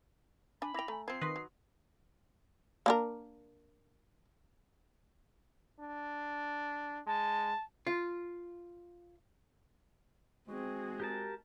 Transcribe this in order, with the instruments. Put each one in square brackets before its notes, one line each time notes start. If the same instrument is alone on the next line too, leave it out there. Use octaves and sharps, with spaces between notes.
[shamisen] D4 G#5 [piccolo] B5
[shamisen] E4 G5 [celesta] D6 A#6 F7
[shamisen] A3 [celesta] G#5 A#5
[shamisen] F3 C4 [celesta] G#6 [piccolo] C7
[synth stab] D#3 B4 D#5 [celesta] C6 C#6 D#6
[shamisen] F#3
A#3 D4 A#4
[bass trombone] D4
[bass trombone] G#3 [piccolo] A5
[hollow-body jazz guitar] F4
[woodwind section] G#3 F#4 [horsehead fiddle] C4 G#4
[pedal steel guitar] G4 A#4 A5